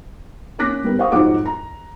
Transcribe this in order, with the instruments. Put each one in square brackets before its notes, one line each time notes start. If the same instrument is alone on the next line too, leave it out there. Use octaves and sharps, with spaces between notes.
[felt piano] A#3 C#4 D6 F#6 A#6 B6
G3 B3 A#4
A#4 C5 F5 F#5 C#6 D#6
F2 G#2 F#3 C5 F#5 D6
A#5